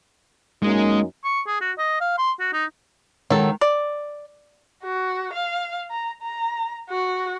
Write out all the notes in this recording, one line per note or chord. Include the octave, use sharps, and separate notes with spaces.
F#2 G#3 A#3 D#4
C#6
G#4
F#4
D#5
F5
C6
F#4
D#4
D#3 F#3 G#3 A4
D5
F#4
F5
A#5
A#5
F#4